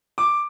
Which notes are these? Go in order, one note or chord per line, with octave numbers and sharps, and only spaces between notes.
D6